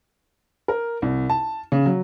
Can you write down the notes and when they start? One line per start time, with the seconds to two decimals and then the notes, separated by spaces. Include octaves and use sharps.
0.68 A#4
1.02 C2
1.30 A5
1.72 C#3
1.86 F#3